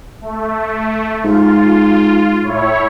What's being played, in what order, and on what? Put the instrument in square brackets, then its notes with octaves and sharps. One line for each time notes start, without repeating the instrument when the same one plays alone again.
[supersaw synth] A3
[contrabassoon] G#2 [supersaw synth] F4
[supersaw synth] A2 E4 C#5